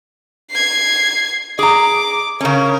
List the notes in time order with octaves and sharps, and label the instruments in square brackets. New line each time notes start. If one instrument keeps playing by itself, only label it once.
[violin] G#6 C7
[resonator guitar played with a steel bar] G#4 A#5 [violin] D6
[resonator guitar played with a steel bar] C#3 C#4 [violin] A#4